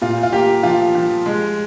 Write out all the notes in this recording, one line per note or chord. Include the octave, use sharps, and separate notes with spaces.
A#2 F4
F4
A#3 G4
F3 F4
F3
G#3